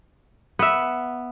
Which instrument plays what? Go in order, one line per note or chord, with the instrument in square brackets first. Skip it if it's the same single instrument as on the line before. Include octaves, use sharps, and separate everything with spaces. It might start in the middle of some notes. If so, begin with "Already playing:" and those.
[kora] B3 E5